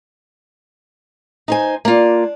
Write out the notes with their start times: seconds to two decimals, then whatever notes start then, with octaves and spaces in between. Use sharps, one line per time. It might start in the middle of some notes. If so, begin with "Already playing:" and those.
1.48 D#4 C5 G#5
1.85 A#3 D4 F4